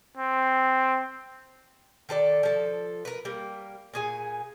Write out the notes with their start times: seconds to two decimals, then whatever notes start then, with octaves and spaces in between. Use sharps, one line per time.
0.17 C4
2.09 D#3 A4 B4 D5
2.43 F3 A4
3.05 A#4 B4
3.25 G3 A#3
3.94 A#2 G#4 G#5